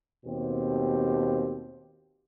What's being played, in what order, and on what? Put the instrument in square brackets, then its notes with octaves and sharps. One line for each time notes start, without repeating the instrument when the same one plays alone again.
[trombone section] D#2 B2 C4 G4